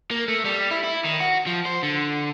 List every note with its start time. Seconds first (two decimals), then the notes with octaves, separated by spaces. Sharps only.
0.11 A#3
0.28 A3
0.45 G3
0.71 E4
0.84 E4
1.05 D#3
1.21 F#4
1.46 F3
1.65 C5
1.83 D3